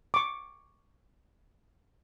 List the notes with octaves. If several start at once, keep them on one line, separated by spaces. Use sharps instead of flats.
C#6 D6